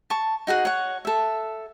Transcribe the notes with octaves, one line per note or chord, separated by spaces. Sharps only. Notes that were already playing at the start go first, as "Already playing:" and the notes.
A5 C#6
D#4 F#4 G#4 F#5
C#5 F#5
A4 E5